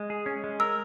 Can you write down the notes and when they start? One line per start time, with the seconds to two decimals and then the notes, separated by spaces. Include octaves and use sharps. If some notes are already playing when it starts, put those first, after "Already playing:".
Already playing: G#3
0.10 G#4
0.26 C#4
0.44 G#3
0.60 A#4 E6